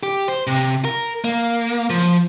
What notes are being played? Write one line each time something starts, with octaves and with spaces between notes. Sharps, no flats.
G4
C5
C3
A#4
A#3
F3